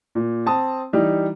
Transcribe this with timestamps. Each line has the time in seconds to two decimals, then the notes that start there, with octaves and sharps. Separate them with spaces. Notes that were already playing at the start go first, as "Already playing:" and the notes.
0.15 A#2
0.46 C4 A5 D#6
0.93 E3 G3 D#4